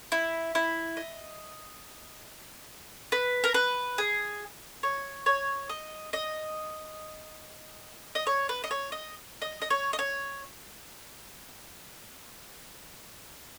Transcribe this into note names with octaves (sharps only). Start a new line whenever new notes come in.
E4
E4
D#5
B4
A#4
B4
G#4
C#5
C#5
D#5
D#5
D#5
C#5
B4
D#5
C#5
D#5
D#5
D#5
C#5
D#5
C#5